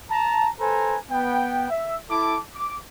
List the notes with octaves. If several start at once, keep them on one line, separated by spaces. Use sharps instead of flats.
A5 A#5
A4 B4 C5 G#5 A#5
B3 G5
E5
E4 A4 A5 D6
D6